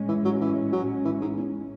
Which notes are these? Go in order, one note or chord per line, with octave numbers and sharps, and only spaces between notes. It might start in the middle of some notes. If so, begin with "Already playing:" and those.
Already playing: A2 G#3 C#4
E3
F#3
E3
F#3
E3
G#2
E2